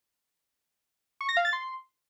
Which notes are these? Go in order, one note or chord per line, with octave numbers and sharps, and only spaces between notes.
C#6
A#6
F5
A6
C6